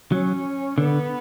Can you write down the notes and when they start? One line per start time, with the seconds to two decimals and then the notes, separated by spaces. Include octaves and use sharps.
0.11 F#3 C#4
0.78 D3 B3